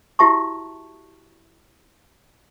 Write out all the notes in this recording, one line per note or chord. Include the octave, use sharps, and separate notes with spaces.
E4 F#4 G4 E5 A5 C#6